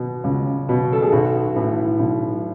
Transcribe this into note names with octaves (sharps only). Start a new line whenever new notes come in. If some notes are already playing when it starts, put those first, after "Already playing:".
Already playing: B2
C#2
B2
A4
G#4
B1 F#4
A2 E3
B1